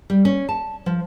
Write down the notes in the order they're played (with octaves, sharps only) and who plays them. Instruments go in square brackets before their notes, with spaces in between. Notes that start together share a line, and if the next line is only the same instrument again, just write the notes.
[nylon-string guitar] G3
C#4
A5
F3